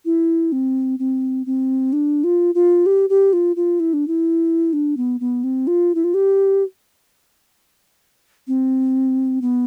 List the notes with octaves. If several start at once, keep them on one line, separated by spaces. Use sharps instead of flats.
E4
C4
C4
C4
D4
F4
F4
G4
G4
F4
F4
E4
D4
E4
D4
B3
B3
C4
F4
E4
F4
G4
C4
B3